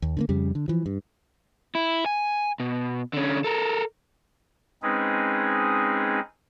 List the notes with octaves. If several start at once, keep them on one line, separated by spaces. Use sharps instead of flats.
D#2
D3 A3 A#3
F2 C#3 G3
D3
E3 F3
G2
E4
G#5
B2
D3 C#4
A4 A#4
G#3 C4 C#4 D#4 G#4 B4